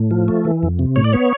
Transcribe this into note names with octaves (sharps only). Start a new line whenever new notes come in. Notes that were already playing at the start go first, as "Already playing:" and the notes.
Already playing: A2
F3
A3
E3
F2
C3
A2 C#5
D5
B3 C#5